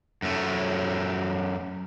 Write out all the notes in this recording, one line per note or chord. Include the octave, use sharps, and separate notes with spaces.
F#2 A3